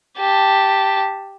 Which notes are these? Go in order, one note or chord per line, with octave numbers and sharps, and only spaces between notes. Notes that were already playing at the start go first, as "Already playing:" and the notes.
G4 A5